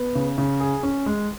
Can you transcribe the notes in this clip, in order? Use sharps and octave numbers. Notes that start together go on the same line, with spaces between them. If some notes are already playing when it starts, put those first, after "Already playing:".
Already playing: B3
C#3
C#3
G#4
C#4
G#3